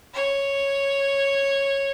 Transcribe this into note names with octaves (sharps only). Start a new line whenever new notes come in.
C#5